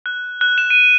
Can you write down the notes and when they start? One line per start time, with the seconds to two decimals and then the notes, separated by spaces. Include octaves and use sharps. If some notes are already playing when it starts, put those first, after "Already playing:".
0.06 F#6
0.41 F#6
0.58 E7
0.70 D#7